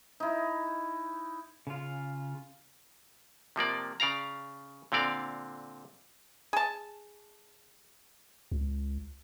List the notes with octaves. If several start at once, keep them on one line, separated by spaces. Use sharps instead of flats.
D#4 E4
C#3 F4
C3 F3 A#3 D5
C#3 D5 F5 A#5
A#2 D3 C4 D5 F5
G#4 A5
C#2